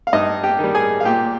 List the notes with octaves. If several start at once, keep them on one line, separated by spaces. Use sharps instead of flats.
F5
G2 D#4 D#5
G4 G5
D#3 G3
G#4 G#5
F5
A#2 G4 G5